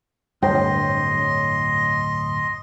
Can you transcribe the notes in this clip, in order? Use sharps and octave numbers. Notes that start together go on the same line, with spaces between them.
D1 G2 C#5 D#5 G5 C6